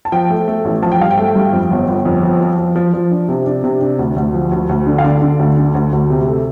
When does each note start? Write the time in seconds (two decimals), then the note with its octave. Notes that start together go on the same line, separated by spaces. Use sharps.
0.05 A5
0.12 F3 G5
0.30 A3
0.47 A3
0.65 A1
0.82 F3 A5
0.92 G5
1.00 G2 F5
1.11 G5
1.18 A3
1.35 G2
1.53 F2
1.71 G1
1.88 G1
2.05 F2
2.23 F3
2.41 F3
2.59 F3
2.76 F3
2.93 F3
3.11 D4
3.29 C3
3.46 D4
3.64 C3
3.81 D4
3.99 D2
4.16 D2
4.34 F3
4.52 D2
4.69 D2
4.86 D3
4.98 F5
5.04 D3 D5
5.22 D3
5.39 D2
5.57 D3
5.74 D2
5.92 D2
6.10 C3
6.27 A3